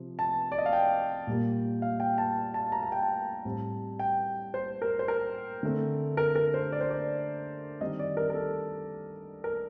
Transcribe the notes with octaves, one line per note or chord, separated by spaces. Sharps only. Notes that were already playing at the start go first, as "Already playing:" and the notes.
Already playing: C3 F3 C4
A5
D5
D#5
F5
G5
A#2 G3 A#3
F5
G5
A5
A5
A#5
A5
G5
A5
A2 G3 C4
G5
C5
A#4
C5
A#4
D3 A3 C4
A#4
A#4
C5
D5
C5
D5
D#3 G3 C4 D#5
D5
A#4
A#4
A4
A#4